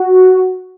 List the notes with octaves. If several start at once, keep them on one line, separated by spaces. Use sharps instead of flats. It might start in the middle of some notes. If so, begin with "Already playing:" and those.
Already playing: F#4